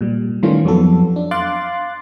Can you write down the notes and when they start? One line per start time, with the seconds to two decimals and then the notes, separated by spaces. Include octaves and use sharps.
0.01 A#2 G3
0.43 D#3 E3 G3 A3 C#4 F4
0.65 F2 F#3 B3 A4
1.16 D4
1.31 F5 C6 D6 F#6 A6